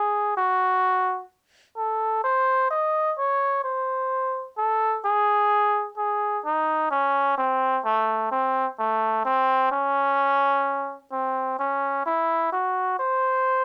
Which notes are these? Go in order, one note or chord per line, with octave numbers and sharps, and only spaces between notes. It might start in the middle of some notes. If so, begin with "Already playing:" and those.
Already playing: G#4
F#4
A4
C5
D#5
C#5
C5
A4
G#4
G#4
D#4
C#4
C4
A3
C4
A3
C4
C#4
C4
C#4
E4
F#4
C5